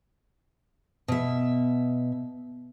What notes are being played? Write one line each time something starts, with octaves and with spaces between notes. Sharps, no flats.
B2 E5